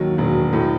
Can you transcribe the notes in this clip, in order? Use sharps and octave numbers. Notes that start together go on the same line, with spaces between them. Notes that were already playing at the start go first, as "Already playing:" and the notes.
Already playing: D#2 D#3 F#3
E1
A2